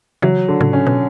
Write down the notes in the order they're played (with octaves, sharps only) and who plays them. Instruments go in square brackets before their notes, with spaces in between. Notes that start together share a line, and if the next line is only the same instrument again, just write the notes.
[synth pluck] C#3 E3 [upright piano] F#3
[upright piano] D3
[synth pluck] A2 C#3
[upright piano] C#4
[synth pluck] B2